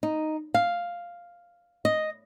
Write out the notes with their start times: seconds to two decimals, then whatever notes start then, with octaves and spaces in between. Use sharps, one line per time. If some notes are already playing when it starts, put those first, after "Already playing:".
0.03 D#4
0.54 F5
1.85 D#5